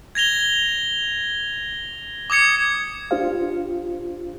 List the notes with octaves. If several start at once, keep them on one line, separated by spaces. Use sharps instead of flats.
G#6 A#6 F7 G7
D6 D#6 G#6 C#7
D4 F4 G4 C5 F5